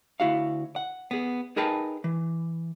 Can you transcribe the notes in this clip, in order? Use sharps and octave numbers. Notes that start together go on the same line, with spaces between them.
D2 E4 F#4 F5
F#5
B3 G#4
D#4 G#4 A#4 B4 G5 A5
E3